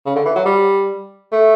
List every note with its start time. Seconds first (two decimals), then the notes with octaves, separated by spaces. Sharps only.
0.06 C#3
0.16 D3
0.25 E3
0.36 F#3
0.45 G3
1.32 A3